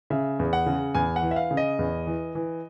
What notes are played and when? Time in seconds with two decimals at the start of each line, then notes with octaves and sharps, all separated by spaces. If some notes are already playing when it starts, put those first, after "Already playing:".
0.10 C#3 E5
0.39 E2
0.53 F#5
0.66 C#3
0.95 E2 G#5
1.16 F#5
1.22 E3
1.31 E5
1.36 F5
1.51 C#3
1.57 D#5
1.79 E2
2.07 E3
2.35 E3